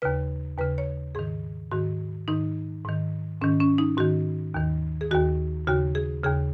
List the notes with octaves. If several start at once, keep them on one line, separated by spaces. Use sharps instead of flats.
D#2 C#3 B4
D#2 C#3 B4
C#5
G#2 D#3 G#4
G#2 D#3 F#4
G#2 D#3 D#4
G#2 D#3
G#2 D#3 C#4
C#4
D#4
G#2 D#3 F#4
D#2 D#3
G#4
D#2 D#3 F#4
D#2 C#3 F#4
G#4
D#2 C#3 G#4